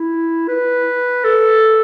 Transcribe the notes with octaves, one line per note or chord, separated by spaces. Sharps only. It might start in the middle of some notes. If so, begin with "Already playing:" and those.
Already playing: E4
B4
A4